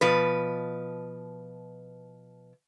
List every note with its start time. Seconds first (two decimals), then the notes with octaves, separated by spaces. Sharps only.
0.01 B2 F3 B4